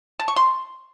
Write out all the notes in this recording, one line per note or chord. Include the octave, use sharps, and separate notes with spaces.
A5
C#6
C6